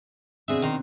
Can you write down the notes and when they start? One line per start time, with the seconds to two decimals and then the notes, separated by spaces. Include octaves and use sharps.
0.48 B2 C4 D4 G#4 E5
0.63 D#3 A#5 C6